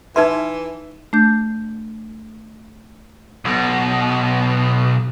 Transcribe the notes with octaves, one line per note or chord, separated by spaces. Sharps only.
E3 D#4 B4 E5 C6
A3 D4 G6
B1 B2